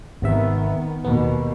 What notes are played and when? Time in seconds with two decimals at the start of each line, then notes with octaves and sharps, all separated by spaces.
0.22 G#1 C3 D#3 B3 E5
1.04 D#2 B2 B3